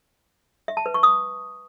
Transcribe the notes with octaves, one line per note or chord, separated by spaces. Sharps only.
E5
A5
B4
C#6
D#6